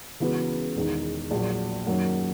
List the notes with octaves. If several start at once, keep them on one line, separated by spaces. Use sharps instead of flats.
C#2 C#3 E3 B3 F#4
E1 E2 D#3
A#1 A#2 F#3
F#2 D#3 F#3 A#3